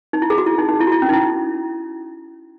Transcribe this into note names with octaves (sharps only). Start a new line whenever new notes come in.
D#4
E4
G#4
F#4
E4
D#4
D#4
E4
F#4
E4
C#4
D#4
E4